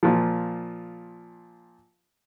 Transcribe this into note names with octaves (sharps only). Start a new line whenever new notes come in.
A#2 F3